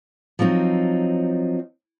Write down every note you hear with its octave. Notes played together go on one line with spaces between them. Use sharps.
F3 F#3 C4 D#4